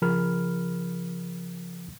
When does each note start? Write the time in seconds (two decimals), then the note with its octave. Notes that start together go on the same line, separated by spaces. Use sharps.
0.02 C#3 F3 G#4 A#4 B5 F6